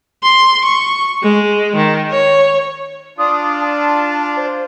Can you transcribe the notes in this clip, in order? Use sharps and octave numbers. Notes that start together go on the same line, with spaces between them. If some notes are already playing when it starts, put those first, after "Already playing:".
C6
C#6
G#3
D#3
C#5
D4 F4 D#6
A5
C5